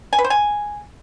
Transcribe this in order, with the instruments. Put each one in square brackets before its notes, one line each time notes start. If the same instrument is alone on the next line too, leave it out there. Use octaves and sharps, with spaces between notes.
[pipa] G#5
B4
C5
G#5